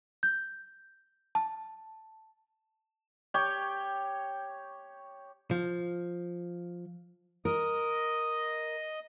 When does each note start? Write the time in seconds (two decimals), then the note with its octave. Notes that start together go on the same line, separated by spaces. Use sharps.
0.23 G6
1.35 A5
3.34 G4 C#5 G5
5.51 F3
7.45 A#4 D#5